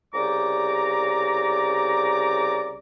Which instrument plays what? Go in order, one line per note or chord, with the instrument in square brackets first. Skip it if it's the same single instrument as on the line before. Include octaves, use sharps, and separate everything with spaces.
[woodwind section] C2 C#3 G4 D5 A#5 D6